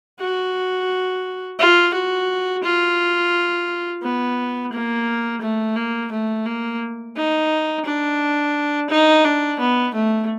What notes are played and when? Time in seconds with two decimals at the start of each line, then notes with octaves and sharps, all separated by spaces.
0.19 F#4
1.59 F4
1.94 F#4
2.64 F4
4.03 B3
4.72 A#3
5.41 A3
5.76 A#3
6.12 A3
6.46 A#3
7.16 D#4
7.85 D4
8.90 D#4
9.24 D4
9.60 B3
9.95 A3